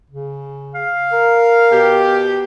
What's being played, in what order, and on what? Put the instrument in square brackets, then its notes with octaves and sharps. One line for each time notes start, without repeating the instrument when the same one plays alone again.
[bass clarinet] C#3
[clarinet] F5
[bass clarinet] A#4
[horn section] B2 G4